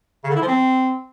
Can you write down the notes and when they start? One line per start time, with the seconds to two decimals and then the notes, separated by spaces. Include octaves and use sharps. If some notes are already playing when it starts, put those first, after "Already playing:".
0.24 C#3
0.30 D3
0.36 E4
0.41 F3
0.47 C4